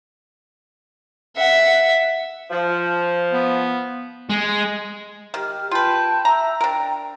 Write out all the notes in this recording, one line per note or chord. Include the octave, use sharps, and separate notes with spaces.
E5 F#5
F3
B3
G#3
D#3 G4 F6
F4 B4 G5 A5 G6
E5 A#5 E6
D4 A#4 G5 A#5